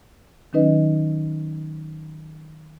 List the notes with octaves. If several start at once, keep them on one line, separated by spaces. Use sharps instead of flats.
D#3 F#3 C#4 D#4 B4 D#5